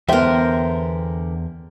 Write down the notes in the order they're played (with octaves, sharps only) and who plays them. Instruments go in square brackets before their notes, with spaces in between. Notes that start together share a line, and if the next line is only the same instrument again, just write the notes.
[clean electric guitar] E2 E5 [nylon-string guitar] D3 B3 [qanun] A#4 C5 [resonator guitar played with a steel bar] G5